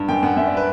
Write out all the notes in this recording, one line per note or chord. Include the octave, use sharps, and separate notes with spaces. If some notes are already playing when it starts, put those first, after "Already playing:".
Already playing: G2
F#2 G5
F#2 F#5
F#2 E5
D5
B4